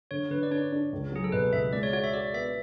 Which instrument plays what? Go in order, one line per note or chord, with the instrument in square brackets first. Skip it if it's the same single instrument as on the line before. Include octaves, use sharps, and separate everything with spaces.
[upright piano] D3 [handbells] C#5
[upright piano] D3 [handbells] B4
[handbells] D5
[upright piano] D4 [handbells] C#5
[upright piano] D4
C#2
[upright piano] F#3 [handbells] G#4
[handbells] A4
[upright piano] B2 [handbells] B4
[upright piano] C#2 [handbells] E5
[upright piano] G#3 [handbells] D5
[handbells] C#5
[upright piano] F#4 [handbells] C#5
[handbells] E5
[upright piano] F#4 [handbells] D5
[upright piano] B3 [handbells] E5